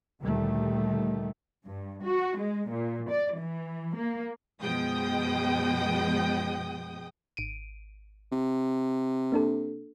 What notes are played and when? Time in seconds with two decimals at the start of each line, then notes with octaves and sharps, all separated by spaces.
0.21 D2 A#2 D#3 G3 A3
1.66 G2
2.05 F#4
2.40 G#3
2.72 A#2
3.11 D5
3.39 E3
3.98 A#3
4.62 F#2 B2 F3 G#3 G5 D#6
7.37 G#1 D7 D#7
8.32 C3
9.32 A#3 D4 A4